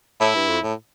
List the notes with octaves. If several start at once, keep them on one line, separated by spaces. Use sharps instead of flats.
A2 E4
G2
F2
A2